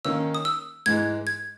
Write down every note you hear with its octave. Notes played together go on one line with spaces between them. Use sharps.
D#3 A#3 C#4 E6
D#6
E6
G#2 E3 G#3 G#6
G#6